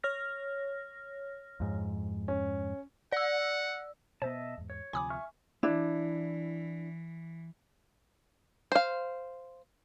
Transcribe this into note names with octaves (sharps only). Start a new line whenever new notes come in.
C#5 F6 A#6
F2 G#2
C#4
D5 F#5 E6
B2 B3 C5 D#5 E5 A5
E2 G#2
C#5
D2 C3 F3 G#5 B5 D6 D#6
E5 C#6 F6
E3 D4 E4
C5 F5